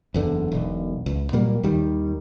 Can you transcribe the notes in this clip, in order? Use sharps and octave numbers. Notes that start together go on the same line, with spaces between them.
F#1 E2 D3
E1 B1
C#2
A#2 F#3 G3 A#3
D#2 D#3 G3